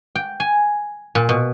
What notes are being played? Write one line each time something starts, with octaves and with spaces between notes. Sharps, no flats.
G5
G#5
A#2
B2